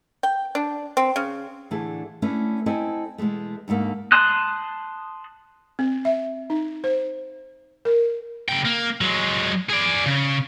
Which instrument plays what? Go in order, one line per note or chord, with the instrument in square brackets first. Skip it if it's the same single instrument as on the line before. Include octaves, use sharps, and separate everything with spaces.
[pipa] G5
D4
C4
C#3
[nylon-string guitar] A2 D3 E3 G#4 A4
A3 B3 C#4 D4 E4 B4
C4 E4 A4 D#5 G#5
B2 E3 G#3 A3
D2 G#2 A3 A#3
[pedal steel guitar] A5 C6 D#6 F#6
[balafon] C4
E5
D#4
C5
A#4
[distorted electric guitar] C#3 G5
A#3
F#3 G#3
G#4 D5
C#3